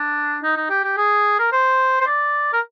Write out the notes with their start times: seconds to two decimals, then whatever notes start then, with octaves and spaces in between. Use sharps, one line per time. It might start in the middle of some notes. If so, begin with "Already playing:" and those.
Already playing: D4
0.43 D#4
0.56 D#4
0.70 G4
0.84 G4
0.97 G#4
1.39 A#4
1.52 C5
2.00 C5
2.06 D5
2.53 A#4